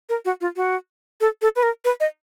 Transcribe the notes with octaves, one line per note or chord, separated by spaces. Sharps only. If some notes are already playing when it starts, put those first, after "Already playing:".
A#4
F#4
F4
F#4
A4
A4
B4
A#4
B4
D#5